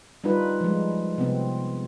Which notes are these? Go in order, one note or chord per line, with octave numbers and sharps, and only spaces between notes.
G3 D4 D#4 F4 B4
F3 G#3
C3 B3 C4